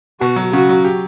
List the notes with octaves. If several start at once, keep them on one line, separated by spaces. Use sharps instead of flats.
B2 F#4
F#3
C#3 F#4
F#3
G4